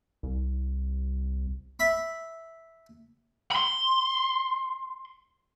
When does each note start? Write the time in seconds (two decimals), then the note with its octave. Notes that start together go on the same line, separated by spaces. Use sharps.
0.23 C2
1.79 E5 B5
3.51 B5 C6